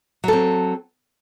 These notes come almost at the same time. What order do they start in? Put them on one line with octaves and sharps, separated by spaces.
F#3 A4 C4